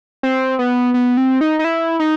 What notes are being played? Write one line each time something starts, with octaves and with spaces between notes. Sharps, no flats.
C4
B3
B3
C4
D#4
D#4
E4
D#4